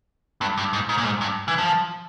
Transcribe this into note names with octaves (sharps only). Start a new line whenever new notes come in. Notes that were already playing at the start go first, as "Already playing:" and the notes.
G2
G2
G#2
G#2
A#2
G#2
G2
E3
F3